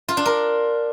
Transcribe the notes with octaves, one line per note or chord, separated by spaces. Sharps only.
F4
D4
A#4